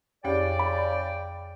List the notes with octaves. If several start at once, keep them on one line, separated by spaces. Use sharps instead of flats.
F2 C#3 C#4 G4 D5 G5
B5